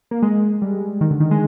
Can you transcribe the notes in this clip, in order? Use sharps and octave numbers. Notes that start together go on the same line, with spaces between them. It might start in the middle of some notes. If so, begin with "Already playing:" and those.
A#3
G#3
G3
D#3
D3
D#3
G#3